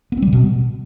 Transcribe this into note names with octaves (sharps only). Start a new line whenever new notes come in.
B3
C4
G3
C#3
B2